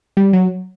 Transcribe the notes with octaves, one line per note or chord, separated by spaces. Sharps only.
G3
F#3